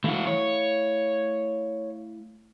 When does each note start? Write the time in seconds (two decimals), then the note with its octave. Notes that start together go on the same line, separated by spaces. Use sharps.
0.04 E3 A3 E4 F#4 F5
0.27 C#5